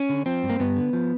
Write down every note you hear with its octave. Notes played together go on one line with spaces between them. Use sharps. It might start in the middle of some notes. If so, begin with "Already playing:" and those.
Already playing: C#4
D3
F3 C4
G2
A#3
G2 B3
D3
F3